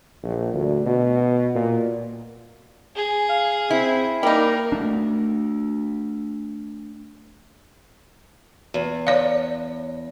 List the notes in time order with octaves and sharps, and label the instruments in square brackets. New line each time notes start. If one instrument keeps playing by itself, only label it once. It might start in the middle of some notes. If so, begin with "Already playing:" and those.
[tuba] A#1
D2
B2
A#2
[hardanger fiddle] G#4
[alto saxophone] F5
[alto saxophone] C4 [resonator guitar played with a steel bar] E4
[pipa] G3 D#4 [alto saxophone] A#3 [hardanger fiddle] A#4
[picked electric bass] A3 D4
[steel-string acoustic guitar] E2
[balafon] C#5 D5 F5